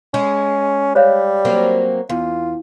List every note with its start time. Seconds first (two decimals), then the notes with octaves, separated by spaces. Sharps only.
0.14 G#3 C#4
0.95 G3 C5 C#5 F5
1.45 F#3 A#3 C4
2.09 E2 F4